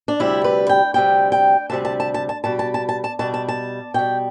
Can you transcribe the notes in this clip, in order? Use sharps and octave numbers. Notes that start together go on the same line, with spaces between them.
D4
D2 C3 G3 E4
B4
G5
D2 C3 G3 G5
G5
D2 C3 G3 A5
A5
A5
A5
A5
B2 G3 A5
A5
A5
A5
A5
B2 G3 A5
A5
A5
B2 G3 G5